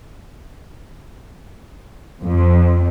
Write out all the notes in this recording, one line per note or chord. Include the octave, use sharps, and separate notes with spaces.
F2